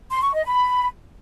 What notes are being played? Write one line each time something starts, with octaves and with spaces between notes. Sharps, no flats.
C6
C#6
D#5
B5